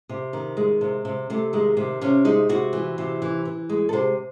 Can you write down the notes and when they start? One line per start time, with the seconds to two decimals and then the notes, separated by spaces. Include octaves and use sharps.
0.09 C3
0.33 D#3
0.57 G#3
0.81 C3
1.05 C3
1.30 C3 A3
1.53 D#3 G#3
1.77 C3
2.01 C3 C#4
2.25 G#3 D#4
2.49 C3 F#4
2.73 E3
2.98 C3
3.22 E3
3.45 E3
3.69 G#3
3.89 A4
3.93 C3 C5